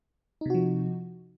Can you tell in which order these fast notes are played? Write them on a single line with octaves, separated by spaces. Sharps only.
D#4 C3 F#4 F3